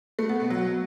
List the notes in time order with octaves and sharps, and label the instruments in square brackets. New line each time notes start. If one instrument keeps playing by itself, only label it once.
[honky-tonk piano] A3
B3
B2
F#3